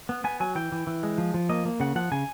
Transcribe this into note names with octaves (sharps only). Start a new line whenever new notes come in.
B3
B3 G#5
F#3 G#5
E3 G5
E3
E3
G#3
F3
F3
A#3 D#5
A#3
C#3 F#5
F3 F#5
C#3 G#5